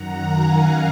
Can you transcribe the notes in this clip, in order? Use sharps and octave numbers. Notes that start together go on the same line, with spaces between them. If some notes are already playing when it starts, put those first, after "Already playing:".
Already playing: F#2 D#3 F#5 A#5
F5 G#5